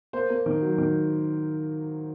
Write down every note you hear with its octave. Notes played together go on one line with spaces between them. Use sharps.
A#3 C5
A#3
D#3
F#3
D#3